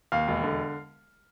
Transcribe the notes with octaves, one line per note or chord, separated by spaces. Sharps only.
D#2 F5
E1
D3